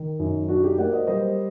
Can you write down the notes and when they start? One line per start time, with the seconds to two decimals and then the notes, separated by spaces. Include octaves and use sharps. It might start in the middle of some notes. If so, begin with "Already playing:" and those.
Already playing: D#3
0.19 F#2 D#4
0.48 F#3 D4 F#4
0.63 D#4 G4
0.78 A#3 D5 F#5
0.93 C5 D#5
1.07 G3 C5 D#5